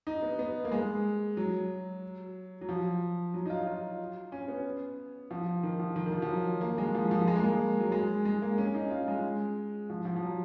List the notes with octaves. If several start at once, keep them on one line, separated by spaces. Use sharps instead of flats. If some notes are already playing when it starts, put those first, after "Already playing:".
D#4
B3
B3
A#3
G#3
F#3
F#3
F3
F#3
D#4
F4
F4
C#4
B3
F3
D#3
F3
D#3
D#3
F3
F3
F#3
A#3
G#3
F3
F3
G#3
A#3
G#3
F#3
G#3
G#3
A#3
C#4
D#4
F4
G#3
F3
F3
F3
F#3